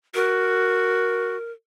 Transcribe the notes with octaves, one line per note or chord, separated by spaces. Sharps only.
F#4 A#4